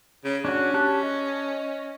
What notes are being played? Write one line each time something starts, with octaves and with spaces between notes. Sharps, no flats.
C#3
C#4 D4 F#4
G4 A5 F#6
D#5